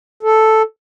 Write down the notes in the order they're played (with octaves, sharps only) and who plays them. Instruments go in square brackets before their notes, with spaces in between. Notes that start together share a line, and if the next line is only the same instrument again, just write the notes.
[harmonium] A4